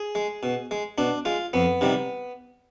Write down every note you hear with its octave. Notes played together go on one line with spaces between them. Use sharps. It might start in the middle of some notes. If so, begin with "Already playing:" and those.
Already playing: G#4
G#3
B2
G#3
B2 D4
G#3 F4
F2 B3
C3 D#3 G3